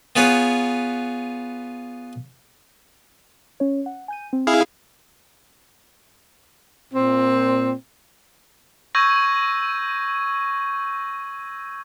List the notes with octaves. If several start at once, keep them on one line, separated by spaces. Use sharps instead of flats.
B3 F4 G#4 B4 C#5
C#4 C#5
F#5
G#5 G6 D#7
C4
E4 G#4 F5
A#2 C4
C#6 E6 G6 G#6 A#6 D#7